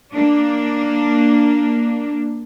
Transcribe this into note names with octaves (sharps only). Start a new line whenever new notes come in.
A#3 D4